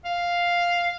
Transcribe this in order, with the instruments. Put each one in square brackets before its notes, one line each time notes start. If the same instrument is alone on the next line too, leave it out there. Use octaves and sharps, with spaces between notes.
[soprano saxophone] F5